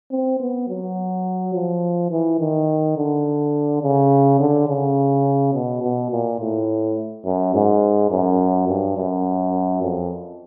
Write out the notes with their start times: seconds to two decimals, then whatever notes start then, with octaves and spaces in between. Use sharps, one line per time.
0.11 C4
0.40 B3
0.68 F#3
1.54 F3
2.11 E3
2.40 D#3
2.97 D3
3.82 C#3
4.40 D3
4.68 C#3
5.54 B2
5.83 B2
6.11 A#2
6.40 A2
7.25 F#2
7.54 G#2
8.11 F#2
8.68 G2
8.97 F#2
9.82 F2